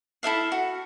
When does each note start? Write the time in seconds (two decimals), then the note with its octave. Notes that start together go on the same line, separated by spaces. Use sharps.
0.23 E4 A4 E5 F5
0.52 F#4